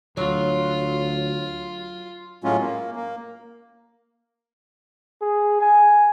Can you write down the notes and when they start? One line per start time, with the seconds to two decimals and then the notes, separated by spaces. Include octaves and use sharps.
0.17 D2 F#3 F4
2.44 A2 F#3 G#3 C#4 F4
2.60 A#3
2.96 A#3
5.22 G#4
5.61 G#5